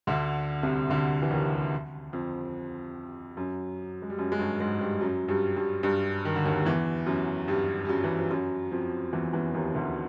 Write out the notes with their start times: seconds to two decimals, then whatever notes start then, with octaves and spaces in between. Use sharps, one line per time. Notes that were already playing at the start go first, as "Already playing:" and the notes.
0.07 D2 D3
0.63 C2 C3
0.90 D2 D3
1.22 E3
1.31 D#2 D#3
2.13 F2 F3
3.37 F#2 F#3
4.02 G#3
4.10 G3
4.19 F#2 F#3
4.32 G#3
4.39 G2 G3
4.60 G#2 G#3
4.81 G2 G3
5.01 F#2 F#3
5.28 G2 G3
5.56 G2 G3
5.83 G2 G3
6.25 D#3
6.36 D3
6.45 D#2 D#3
6.65 E2 E3
7.07 F#2 F#3
7.48 G2 G3
7.85 G3
7.89 F#2 F#3
8.04 E3
8.18 F3
8.31 F#2 F#3
8.71 F2 F3
9.13 E2 E3
9.33 E2 E3
9.54 D#2 D#3
9.74 D2 D3